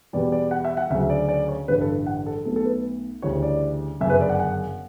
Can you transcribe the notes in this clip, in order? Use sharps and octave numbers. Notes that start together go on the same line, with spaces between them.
E2 B2 G3 D5
D5
F#5
E5
F#5
D2 C#3 F#3 E5
D5
D5
C#5
A1 G2 D3 B4
A4
F#5
A4
B1 B2 A3 A4
A4
B4
D2 C#3 E3 G3 C#5
D5
G1 F#2 C#3 E5
B4
D5
F#5
F#5